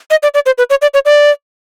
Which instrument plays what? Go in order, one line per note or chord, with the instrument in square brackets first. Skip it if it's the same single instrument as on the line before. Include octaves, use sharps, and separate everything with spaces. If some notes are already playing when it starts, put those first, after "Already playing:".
[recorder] D#5
D5
D5
C5
B4
C#5
D5
C#5
D5